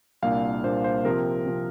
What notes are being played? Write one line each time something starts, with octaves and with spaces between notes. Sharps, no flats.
C2 A#2 A#3 D4 F5
C2 A#2 A#3 D4 C5
C5
C3 F3 C4 A#4
C3 F3 C4